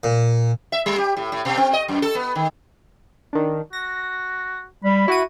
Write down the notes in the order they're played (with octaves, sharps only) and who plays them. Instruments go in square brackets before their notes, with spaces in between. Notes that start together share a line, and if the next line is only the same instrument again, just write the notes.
[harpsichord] A#2
[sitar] E5
G3
G4
A2
A2
B2
C4
D#5
F#2
A4
B3
D#3
[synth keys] D#3 D4
[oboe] F#4 [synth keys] A#6
[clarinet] G3 [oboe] B5
[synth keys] E4 F#5 D#7 [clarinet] F#4